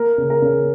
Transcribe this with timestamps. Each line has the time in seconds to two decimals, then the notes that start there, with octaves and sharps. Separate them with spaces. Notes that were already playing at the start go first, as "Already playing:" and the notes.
Already playing: A#3 A#4
0.18 C#3
0.30 A#4
0.42 C#3